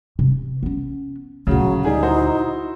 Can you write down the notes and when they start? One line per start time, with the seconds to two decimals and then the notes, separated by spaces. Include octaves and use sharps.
0.19 C3
0.63 B3 C#4
1.47 D2 A#2 C#3 F#3
1.85 G3 D#4 G#4
2.02 E4 F#4 C5